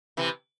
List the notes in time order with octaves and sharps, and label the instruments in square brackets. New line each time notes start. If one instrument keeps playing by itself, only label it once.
[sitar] C3 E3